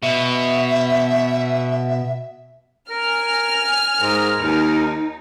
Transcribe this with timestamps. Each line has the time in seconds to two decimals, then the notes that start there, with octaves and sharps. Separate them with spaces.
0.03 B2 E5
2.91 A#4 G#5 F6
4.01 G#2 A#4
4.38 D#2 D#4